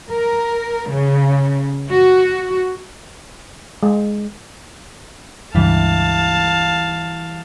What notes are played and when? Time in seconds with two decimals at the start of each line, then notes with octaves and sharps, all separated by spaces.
0.11 A#4
0.91 C#3
1.91 F#4
3.83 G#3
5.55 C#2 G2 E3 G3 F5 A5 A6